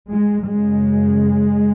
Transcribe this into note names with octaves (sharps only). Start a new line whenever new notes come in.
G#3
F#2 C#3 G#3